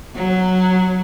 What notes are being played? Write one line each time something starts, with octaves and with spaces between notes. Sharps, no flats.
F#3